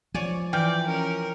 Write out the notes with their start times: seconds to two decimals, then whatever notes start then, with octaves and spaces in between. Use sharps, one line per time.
0.14 F3 C#5 D5 G#5
0.53 E3 D5 G5 F6 G6
0.85 C#4 A#4